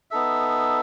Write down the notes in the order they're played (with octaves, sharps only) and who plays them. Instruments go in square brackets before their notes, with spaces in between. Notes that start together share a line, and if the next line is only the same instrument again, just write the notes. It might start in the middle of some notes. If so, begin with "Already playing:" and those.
[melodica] B3 D#4 A4 E5